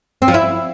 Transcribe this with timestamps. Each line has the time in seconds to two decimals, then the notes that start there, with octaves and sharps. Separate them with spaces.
0.22 C4
0.28 F3
0.34 E4